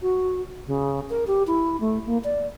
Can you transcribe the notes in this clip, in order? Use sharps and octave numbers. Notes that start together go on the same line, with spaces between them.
F#4
C#3
A#4
G4
E4
A3
A#3
D5